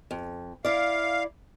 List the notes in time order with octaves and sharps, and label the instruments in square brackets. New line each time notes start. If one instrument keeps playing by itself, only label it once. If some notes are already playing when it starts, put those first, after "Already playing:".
[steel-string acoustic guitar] F2
[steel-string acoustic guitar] E4 D5 [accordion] F5